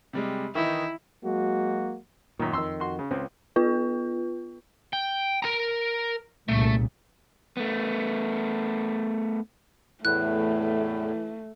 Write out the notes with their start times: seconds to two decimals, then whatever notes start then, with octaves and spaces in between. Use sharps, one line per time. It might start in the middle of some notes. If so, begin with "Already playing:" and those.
0.13 C3 G3 G#3
0.55 D#3 E3 D#4 E4
1.23 F#3 G#3 A#3 F#4
2.39 F#2 A#2 D#3
2.53 F2 D#3 C6 E6
2.80 F#4 C6
2.99 C#3
3.11 C#2 C4 C#4
3.56 B3 F4 B4
4.93 G5
5.42 A#4 A#5
6.48 C2 A#2 C#3 A3
7.57 A3 B3
10.05 E2 A2 E3 A3 F#6